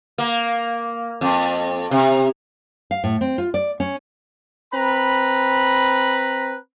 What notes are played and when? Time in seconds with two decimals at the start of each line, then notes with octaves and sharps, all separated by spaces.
0.18 A#3
1.21 F2
1.91 C3
2.91 F5
3.04 A2
3.21 C4
3.38 F4
3.54 D5
3.80 C#4
4.73 C4 B4 A#5 B5